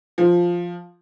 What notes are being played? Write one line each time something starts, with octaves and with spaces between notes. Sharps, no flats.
F3